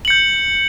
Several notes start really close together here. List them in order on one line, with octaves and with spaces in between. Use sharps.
F#7 C#7 G6